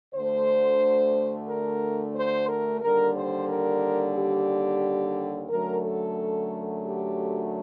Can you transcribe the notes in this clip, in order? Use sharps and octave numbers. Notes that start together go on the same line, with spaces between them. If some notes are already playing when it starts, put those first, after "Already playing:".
D2 D3 A3 C5
A#4
C5
A#4
D#2 D3 G3 A#4
C5
A#4
G4
F#2 D3 F#3 A3 A#4
A4
G4